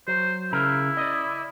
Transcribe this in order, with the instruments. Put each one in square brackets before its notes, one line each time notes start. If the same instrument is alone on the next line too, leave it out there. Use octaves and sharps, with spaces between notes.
[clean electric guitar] F#3 [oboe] C5
[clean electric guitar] C#3 A#4 [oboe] E4
[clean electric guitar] D5 D#5